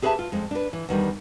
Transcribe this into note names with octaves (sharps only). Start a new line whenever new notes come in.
G4 G#4 B4 D#5 E5 A5
F4
F2 G#3
D4 B4
E3
E2 D#3 G3 D4